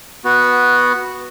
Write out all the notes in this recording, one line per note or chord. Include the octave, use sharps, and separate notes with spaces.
B3 F#4